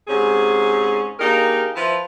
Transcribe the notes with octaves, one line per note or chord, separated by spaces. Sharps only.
G#2 C3 C#4 G#4
A#3 D4 D#4 G4 G#4 A#4
F3 E4 B4